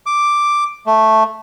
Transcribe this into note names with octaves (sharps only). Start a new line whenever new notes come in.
D6
A3